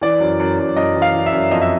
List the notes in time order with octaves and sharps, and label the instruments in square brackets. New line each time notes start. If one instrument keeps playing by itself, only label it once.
[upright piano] E3 D5
F#2
F#2
F#2
F#2 D#5
E3
F5
E3
E5
F#2
F2 D#5
E5